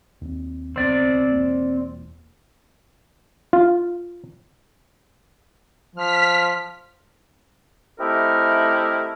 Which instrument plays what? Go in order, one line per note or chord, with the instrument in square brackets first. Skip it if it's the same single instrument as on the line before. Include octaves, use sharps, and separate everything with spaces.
[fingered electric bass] D#2 C4
[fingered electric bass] D1 C2 B3 [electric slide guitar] C4 D5
[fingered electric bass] E1 A#3
[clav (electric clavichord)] F4
[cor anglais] F3 [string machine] F6 B6
[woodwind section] A3 C4 D#4 E4 G4 A#4